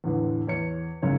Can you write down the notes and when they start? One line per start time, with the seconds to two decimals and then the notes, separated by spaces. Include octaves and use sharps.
0.04 E2 A2 D3 E3
0.47 E2 C#5 C#7
1.02 F#1 G#2 C#3 C#5